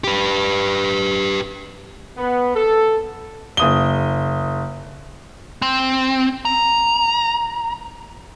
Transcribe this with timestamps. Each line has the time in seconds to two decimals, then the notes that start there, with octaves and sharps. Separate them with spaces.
0.04 G4 B4
2.16 B3
2.55 A4
3.57 F#1 D#6 G7
5.62 C4
6.45 A#5